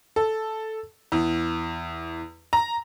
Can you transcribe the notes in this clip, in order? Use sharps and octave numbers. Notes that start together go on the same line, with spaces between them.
A4
E2
A#5